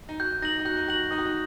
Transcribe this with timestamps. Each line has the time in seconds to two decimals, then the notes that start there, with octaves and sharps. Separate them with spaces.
0.09 D#4
0.20 F#4 G6
0.42 D#4 A#6 F#7
0.59 D#4
0.65 F#4 G6
0.77 D#4
0.88 F#4 A#6 F#7
1.11 D#4 D#6
1.18 F#4
1.26 D#4